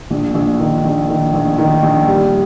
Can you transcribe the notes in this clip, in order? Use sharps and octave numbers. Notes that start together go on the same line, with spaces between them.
A#1
A#1
D#3
A#1
D#3
A#1
D#3
A#1
G3